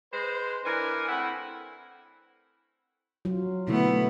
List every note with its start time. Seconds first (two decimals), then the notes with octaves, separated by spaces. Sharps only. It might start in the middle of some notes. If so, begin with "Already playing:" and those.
0.12 G#3 B4 C5
0.64 E3 D4 A#4 G#5
1.08 A2 C4 E4 F#5 B5
3.25 F#3 F4
3.68 B2 D3 A3 B3 E4